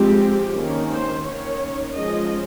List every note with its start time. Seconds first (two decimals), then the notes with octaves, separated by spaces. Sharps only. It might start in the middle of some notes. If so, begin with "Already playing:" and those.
Already playing: F3 G#3 C4 G4
0.54 D#3 A#3 C#4
0.89 C5
1.24 D#3 A#3 C#4 C#5
1.95 F3 G#3 C#4 D#5